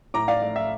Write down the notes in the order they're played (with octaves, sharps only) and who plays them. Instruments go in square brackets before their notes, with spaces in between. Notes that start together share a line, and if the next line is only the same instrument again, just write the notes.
[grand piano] A2 A#5 D6
D5 F5
A3 D5
E5